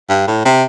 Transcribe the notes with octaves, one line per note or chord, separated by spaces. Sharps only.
G2
A2
C3